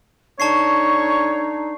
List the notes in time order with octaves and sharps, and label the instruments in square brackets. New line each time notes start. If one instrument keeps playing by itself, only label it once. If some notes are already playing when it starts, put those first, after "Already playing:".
[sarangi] D3 [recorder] D#4 [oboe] C#5 [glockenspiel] A5 C#6 C7